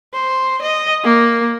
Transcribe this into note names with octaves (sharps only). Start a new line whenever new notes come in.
C5
D#5
A#3